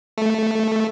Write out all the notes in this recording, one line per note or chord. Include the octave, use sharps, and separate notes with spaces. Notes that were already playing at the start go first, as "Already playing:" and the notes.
A3